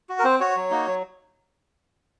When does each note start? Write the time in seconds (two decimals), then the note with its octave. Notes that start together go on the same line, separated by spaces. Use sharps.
0.09 F#4
0.19 A#4
0.24 C4 C5
0.40 F#4 C#5
0.56 F#3
0.71 A#3 D#4 F#4
0.87 F#3